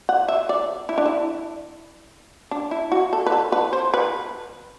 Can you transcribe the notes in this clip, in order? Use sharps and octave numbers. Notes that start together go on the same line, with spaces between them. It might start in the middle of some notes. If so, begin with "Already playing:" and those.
F#5
E5
D5
E4
D4
E4
D4
E4
F#4
A4
B4
A4
B4
C5
B4